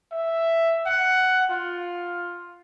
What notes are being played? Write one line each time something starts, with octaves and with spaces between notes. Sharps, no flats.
E5
F#5
F4